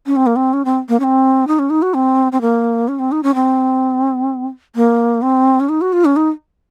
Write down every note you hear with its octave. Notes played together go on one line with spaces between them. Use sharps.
C#4
C4
A#3
C4
C#4
C4
A#3
C#4
C4
D#4
C#4
D#4
F#4
C4
C4
A#3
C#4
C4
D#4
C#4
C4
A#3
C4
C#4
D#4
F#4
F4
C#4
D#4